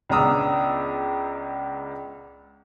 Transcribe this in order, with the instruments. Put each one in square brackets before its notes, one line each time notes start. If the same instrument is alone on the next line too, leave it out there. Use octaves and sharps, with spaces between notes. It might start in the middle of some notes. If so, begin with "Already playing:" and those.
[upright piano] C#2 B3 D4 A#5 D#6 E6